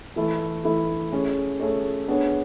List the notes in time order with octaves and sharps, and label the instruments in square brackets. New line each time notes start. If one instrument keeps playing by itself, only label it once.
[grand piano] E3 A3 E4
E3 A3 E4
A3 C#4 G#4 C#5
A3 C#4 G#4 C#5
B3 D4 G#4 C#5